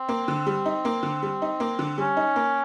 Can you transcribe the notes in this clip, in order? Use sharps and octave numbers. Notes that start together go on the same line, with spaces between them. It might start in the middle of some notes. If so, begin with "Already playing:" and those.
Already playing: C4
A#3
D3
G3
D#4
A#3
D3
G3
D#4
A#3
D3
G3 C#4
D#4
A#3